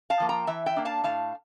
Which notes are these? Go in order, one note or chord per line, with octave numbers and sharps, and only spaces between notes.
F5 A5
F3 A#3
G5 A#5
E3 E5 G5
E5 G5
A#3 D4
F5 A5
A2 F5 A5